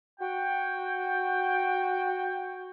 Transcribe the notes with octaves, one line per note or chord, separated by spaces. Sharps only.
F#4 G5